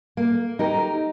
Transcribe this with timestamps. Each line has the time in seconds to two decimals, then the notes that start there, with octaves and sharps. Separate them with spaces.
0.17 A#3
0.59 D#4 G4 A#4